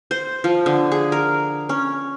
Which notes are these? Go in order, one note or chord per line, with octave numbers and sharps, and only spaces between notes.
C5
F3
D3
G#4
A#4
C#4